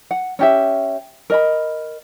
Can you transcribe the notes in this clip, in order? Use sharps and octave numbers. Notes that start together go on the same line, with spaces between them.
F#5
C#4 G4 E5
A#4 D#5 B5